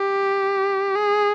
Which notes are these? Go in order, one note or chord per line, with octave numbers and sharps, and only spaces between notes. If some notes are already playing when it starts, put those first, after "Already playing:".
Already playing: G4
G#4